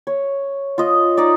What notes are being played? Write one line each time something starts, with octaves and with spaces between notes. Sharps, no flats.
C#5
F4 D#5
D#4 D5